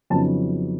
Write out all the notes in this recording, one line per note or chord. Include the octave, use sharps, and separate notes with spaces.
F2 C#3 F#3 B3 D#4 A5